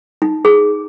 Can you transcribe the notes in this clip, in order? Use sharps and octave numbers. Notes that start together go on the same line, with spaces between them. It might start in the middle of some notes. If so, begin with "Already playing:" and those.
D#4
G#4